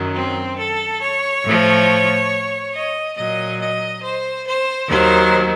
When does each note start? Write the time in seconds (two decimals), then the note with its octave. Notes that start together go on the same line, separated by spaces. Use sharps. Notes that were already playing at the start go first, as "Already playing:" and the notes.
Already playing: F#2 D#3 F#3
0.15 C4
0.58 A4
1.01 C#5
1.44 A2 F3
2.74 D#5
3.17 A#2 F#3 D#5
3.60 D#5
4.03 C5
4.47 C5
4.89 D#2 D#3 F#3 C5